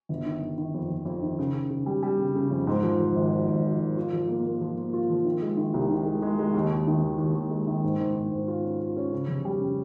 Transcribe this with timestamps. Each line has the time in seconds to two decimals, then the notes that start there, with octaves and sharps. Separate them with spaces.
0.09 G1
0.26 D#3
0.42 G1
0.58 D#3
0.74 F2
0.90 F2
1.06 F2
1.22 D#3
1.39 C#3
1.55 C#3
1.71 C#3
1.86 G3
2.03 G3
2.19 C#3
2.35 C#3
2.51 F2
2.67 G#2
2.83 F3
3.00 F3
3.16 G#1
3.32 F3
3.48 G#1
3.64 F3
3.80 G#1
3.97 F4
4.13 F3
4.28 A#3
4.45 A#3
4.61 F3
4.77 A#3
4.93 F4
5.10 F3
5.25 D#3
5.42 G#3
5.57 D#3
5.74 C2
5.90 D#3
6.06 G#3
6.22 G#3
6.39 G#3
6.54 D#2
6.71 D#2
6.87 D#3
7.03 D#2
7.18 D#2
7.35 D#2
7.51 G#3
7.67 D#3
7.84 G#2
8.00 G#2
8.15 G#2
8.32 G#2
8.48 F4
8.64 C#4
8.80 F4
8.97 C#4
9.12 C#3
9.28 F1
9.45 G3
9.61 C#3